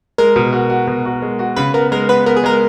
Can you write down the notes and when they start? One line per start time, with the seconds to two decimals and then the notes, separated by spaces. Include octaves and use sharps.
0.18 G#3 A#4
0.36 B2
0.53 F#4
0.70 F#4
0.87 B2
1.05 F#4
1.22 G#3
1.39 F#4
1.56 C#3 B4
1.74 B3 A#4
1.92 G#3 A#4
2.09 B3 B4
2.26 B3 A#4
2.36 G#4
2.44 G#3 A#4